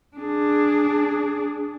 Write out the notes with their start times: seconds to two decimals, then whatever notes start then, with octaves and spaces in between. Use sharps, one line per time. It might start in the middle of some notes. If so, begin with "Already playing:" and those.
0.17 D4 G#4